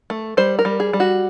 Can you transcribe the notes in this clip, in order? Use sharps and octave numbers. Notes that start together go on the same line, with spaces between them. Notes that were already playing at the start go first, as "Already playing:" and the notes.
A3
G3 C5
A#4
G3
G#4
G3
F#4